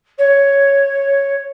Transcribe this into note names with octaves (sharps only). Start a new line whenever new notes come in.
C#5